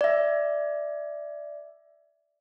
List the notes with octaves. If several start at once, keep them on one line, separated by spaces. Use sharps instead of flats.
D5 E5